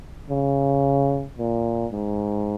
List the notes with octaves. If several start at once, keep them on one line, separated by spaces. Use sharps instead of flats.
C#3
A#2
G#2